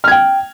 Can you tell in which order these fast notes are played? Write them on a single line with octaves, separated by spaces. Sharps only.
F6 G#6 G5